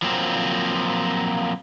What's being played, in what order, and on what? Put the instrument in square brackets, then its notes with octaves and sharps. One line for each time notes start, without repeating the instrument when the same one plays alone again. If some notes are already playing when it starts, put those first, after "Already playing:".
[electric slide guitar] F3 F#3 A#3 C4